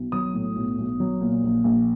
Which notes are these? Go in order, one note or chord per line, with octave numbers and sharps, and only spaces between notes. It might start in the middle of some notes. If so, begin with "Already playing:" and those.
Already playing: B1
F#3 D#6
A2
B1
B1
F#3
A#2
A#1
A#1